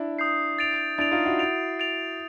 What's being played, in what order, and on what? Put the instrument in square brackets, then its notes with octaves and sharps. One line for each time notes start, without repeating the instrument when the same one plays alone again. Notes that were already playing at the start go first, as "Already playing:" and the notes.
Already playing: [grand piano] D4 E4
[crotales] D#6 G6 C7
A6 D7 F7
[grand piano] D4 E4 [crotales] A6 D7 F7
[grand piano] D#4 F4
E4 F#4
[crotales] A6 D7 F7
A6 D7 F7